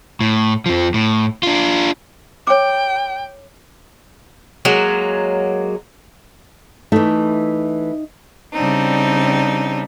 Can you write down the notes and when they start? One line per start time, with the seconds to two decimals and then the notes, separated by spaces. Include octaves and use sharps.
0.21 A2
0.66 F2 F3
0.94 A2
1.43 D4 F4
2.47 C#5 G5 D6
4.65 F#3 G#3 A#3
6.92 E3 A3 D#4 E5
8.53 C#3 G3 C4 D4 D#4